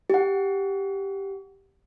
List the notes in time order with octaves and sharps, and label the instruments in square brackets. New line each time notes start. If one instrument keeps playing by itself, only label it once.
[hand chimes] G4 F#5